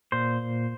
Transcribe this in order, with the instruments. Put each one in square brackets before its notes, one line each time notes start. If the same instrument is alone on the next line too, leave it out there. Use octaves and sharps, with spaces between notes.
[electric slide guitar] A#2 C5